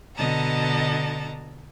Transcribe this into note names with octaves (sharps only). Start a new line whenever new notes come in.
B2 D3 D#5 A5 A#5